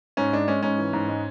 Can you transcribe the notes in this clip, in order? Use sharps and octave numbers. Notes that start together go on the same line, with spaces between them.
G#2 C#4
G#3 D4
G#3 C#4
G#2 C#4
E3
G#2
G#3